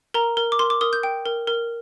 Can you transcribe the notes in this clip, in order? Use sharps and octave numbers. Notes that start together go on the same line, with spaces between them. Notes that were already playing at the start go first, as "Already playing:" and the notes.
A#4 A#5
A#4
D6
A#4 C6
D6
A#4 D#6
G6
G5
A#4
A#4